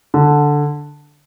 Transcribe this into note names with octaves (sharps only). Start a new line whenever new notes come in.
D3